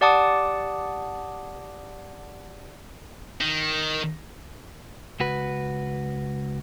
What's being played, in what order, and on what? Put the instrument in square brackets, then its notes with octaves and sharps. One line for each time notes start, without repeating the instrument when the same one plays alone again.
[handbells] G4 D5 F#5 A5 D6 D#6
[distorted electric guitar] D#3
[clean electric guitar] C#2 F#4 B4